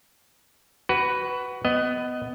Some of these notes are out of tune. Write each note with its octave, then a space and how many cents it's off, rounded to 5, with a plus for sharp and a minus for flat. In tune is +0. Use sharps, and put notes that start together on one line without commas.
F#4 +20 B4 +5
B3 +15 D#5 +0